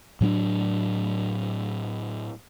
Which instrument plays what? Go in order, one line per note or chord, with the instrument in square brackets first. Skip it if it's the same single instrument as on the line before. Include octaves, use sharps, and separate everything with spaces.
[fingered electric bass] A2 F#3 C#4 D4